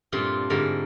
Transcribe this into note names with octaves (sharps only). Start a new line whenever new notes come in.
G2 A#2 A3 C4 F4
G#2 D3 G3 A3 A#4